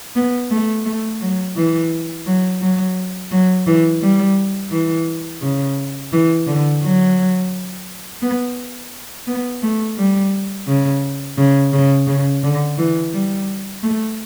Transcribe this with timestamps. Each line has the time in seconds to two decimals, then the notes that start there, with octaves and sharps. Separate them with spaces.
0.16 B3
0.50 A3
0.85 A3
1.21 F#3
1.56 E3
2.26 F#3
2.61 F#3
3.31 F#3
3.66 E3
4.01 G3
4.71 E3
5.41 C#3
6.12 E3
6.47 D3
6.82 F#3
8.22 B3
9.27 B3
9.62 A3
9.97 G3
10.67 C#3
11.37 C#3
11.73 C#3
12.07 C#3
12.43 D3
12.78 E3
13.13 G3
13.83 A3